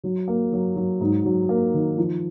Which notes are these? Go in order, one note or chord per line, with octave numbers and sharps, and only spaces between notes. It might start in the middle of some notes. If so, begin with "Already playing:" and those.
F#3
A#3
F#3
F#3
G#2
F#3
A#3
D#3
F3